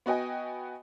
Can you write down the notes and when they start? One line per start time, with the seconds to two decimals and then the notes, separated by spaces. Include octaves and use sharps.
0.06 B3 F#4 D#5 G5 G#5